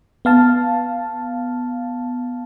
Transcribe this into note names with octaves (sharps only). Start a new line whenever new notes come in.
B3 F5 A5